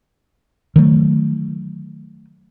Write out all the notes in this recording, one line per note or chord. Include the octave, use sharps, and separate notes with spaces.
D#3 F#3 A3